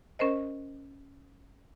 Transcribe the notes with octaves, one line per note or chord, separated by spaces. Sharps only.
C#4 A#4 C5 D#5